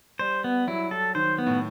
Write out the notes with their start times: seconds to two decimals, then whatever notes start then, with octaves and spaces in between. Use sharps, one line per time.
0.19 G3 C5
0.44 B3
0.67 F#3 E4
0.91 A4
1.15 D#3 C5
1.38 B3
1.47 A2